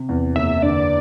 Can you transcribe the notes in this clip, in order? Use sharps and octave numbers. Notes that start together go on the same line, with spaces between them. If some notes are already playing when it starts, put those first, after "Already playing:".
Already playing: C3
E2
F#1 E5
D3 D5